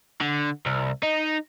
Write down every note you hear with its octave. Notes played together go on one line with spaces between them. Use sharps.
D3
C2
D#4